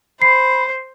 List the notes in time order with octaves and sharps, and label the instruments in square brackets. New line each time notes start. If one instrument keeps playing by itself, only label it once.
[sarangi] C5 [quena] B5 [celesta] C7